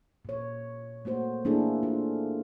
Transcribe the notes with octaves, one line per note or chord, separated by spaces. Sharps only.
A#2 C#5
A3 A#3 F#4 C5
A3 A#3 D4 E4 G#4 A4
F4